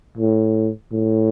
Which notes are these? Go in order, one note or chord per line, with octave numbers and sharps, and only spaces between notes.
A2
A2